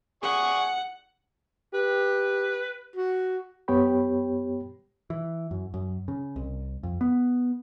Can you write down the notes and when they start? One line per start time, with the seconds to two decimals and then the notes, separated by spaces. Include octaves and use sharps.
0.23 G#4 D5 F#5 C#6
1.74 G4 B4
2.96 F#4
3.68 F#2 B3 G4 C#5 G5 B5
5.10 E3
5.51 F#2
5.74 F#2
6.08 C#3
6.36 C2
6.83 F2
7.01 B3